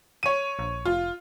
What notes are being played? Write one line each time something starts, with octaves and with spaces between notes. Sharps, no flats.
C#5 D#7
A#1
F1 F4